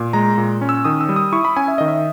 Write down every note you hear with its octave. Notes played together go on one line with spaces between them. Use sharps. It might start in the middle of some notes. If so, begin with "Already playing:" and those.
Already playing: A#2
G#3 A#5
A#2
C#4
E6
D#3 D#6
E6
G3
D#6
E4 C#6
B5
C#4 G#5
E5
D#3 D#5
E5